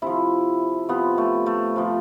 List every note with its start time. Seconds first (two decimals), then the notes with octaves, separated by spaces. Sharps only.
0.02 C3 F3 E4
0.89 C3 F3 B3
1.18 A3
1.46 A3
1.76 C3 F3